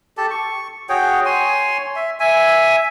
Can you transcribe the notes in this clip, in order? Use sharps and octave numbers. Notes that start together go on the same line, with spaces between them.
G4 A4 A5
C#6
F#4 G#4 C#5 G5
C#5 G#5 C6
E5
E5 G#5